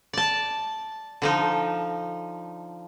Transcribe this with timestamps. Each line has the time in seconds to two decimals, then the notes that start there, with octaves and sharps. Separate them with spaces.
0.13 D5 A5
1.22 D3 F3 D#4